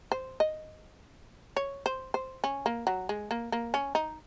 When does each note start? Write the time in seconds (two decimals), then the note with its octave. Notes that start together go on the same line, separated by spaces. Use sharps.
0.12 C5
0.40 D#5
1.56 C#5
1.86 C5
2.14 C5
2.44 C#4
2.66 A#3
2.87 F#3
3.09 G#3
3.31 A#3
3.52 A#3
3.74 C#4
3.95 D#4